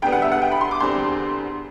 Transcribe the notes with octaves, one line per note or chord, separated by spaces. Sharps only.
E2 D3 G3 B3 G5
F#5
E5
F#5
G5
B5
C6
D6
E2 D3 G3 C4 C6